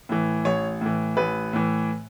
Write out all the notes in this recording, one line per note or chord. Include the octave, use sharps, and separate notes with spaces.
A2 E3
A1 C#5
A2 E3
A1 B4
A2 E3